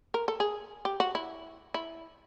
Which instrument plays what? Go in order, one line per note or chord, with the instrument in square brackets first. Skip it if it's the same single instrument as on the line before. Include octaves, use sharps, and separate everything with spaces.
[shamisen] A#4
A4
G#4
G4
F#4
E4
E4